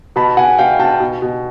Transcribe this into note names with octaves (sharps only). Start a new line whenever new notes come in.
B2 A5 B5
B2 F#5 G#5
B2 F5 G5
B2 G5 A5
B2
B2